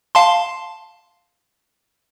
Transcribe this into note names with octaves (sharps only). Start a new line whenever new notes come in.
F5 A5 C6